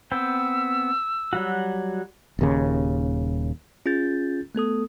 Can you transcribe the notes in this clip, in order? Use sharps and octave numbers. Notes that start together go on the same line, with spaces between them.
B3 C4 G5 E6
F#3 G3 F#4
D#1 D#2 C#3
C#4 F4 G#4 G6 A6
A3 B3 A4 D#6